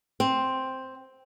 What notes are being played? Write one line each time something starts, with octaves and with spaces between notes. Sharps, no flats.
C4